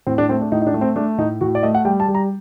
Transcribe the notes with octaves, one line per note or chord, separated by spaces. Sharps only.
A2 C4
D4
A3 C4
D4
A2 D#4
D#4
D4
A3
C4
A3 D4
A2 D#4
A2 F#4
D5
A3 D#5
F#5
G3 G5
A5
G3
A#5